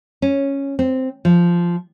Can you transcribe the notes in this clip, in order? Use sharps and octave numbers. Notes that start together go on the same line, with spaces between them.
C#4
C4
F3